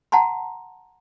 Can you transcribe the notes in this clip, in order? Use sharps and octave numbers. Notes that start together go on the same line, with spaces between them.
F#5 A5 A#5 C6